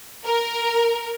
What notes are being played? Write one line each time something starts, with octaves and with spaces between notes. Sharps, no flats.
A#4